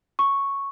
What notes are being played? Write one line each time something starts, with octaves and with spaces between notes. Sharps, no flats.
C#6